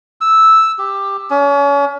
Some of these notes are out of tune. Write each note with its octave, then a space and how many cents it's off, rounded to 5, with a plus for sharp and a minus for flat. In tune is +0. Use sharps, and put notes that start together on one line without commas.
E6 -5
G4 +10
C#4 +35